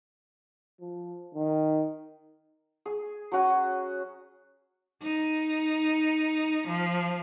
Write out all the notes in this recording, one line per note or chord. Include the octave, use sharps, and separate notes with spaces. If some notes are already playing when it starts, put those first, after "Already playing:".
F3
D#3
G#4
F#3 C#4 F#4 D#6
D#4
F3